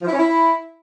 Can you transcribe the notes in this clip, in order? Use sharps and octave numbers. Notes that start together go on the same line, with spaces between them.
F3
E4
C#4
E4